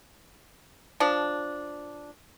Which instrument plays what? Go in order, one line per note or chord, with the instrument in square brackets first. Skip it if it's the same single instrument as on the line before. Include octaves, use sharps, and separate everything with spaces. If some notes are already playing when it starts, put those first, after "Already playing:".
[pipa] F3 D4